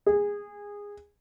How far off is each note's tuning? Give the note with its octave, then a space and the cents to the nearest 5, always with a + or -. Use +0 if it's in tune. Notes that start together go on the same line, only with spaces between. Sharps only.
G#4 -20